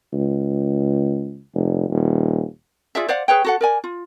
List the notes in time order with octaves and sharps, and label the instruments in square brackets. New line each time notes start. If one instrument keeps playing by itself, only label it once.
[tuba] C#2
F1
D#1
[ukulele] F4 G#4 D5 E5
C5 D5 F5 F#5
G#4 B4 C#5 G5
F#4 A4 F#5
A#4 D5 G#5
F4